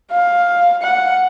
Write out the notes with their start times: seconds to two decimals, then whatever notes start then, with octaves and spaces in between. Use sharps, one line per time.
0.12 F5
0.83 F#5